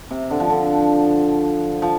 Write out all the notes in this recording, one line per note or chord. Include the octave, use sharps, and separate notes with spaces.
C3
D3
F3
D3
F3